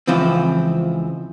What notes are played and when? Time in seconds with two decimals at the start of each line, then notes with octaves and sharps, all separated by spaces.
0.07 C#2 E3 F3 C4